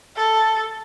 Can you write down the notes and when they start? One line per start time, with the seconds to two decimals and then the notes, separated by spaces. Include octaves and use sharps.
0.16 A4